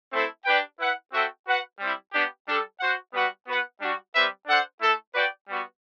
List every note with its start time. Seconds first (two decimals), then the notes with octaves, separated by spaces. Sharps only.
0.11 A3 C4 E4 A4 C5
0.45 D4 G4 B4 D5 G5
0.78 E4 B4 F#5
1.12 C4 F#4 A4 E5 G5
1.46 F#4 B4 F#5
1.79 G3 C4 E4
2.12 B3 D4 G4
2.46 G3 D4 A4
2.78 F#4 C5 F#5
3.13 G3 B3 F#4 B4 F#5
3.46 B3 F#4 B4 F#5
3.79 G3 D4 F#4
4.13 G3 C4 G4 B4 E5
4.46 D4 A4 C5 F#5
4.80 A3 E4 A4
5.13 F#4 B4 D5 G5
5.47 G3 B3 F#4